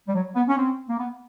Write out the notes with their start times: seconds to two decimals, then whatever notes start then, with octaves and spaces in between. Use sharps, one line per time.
0.08 G3
0.15 F#3
0.35 B3
0.48 C#4
0.57 C4
0.89 A#3
0.99 B3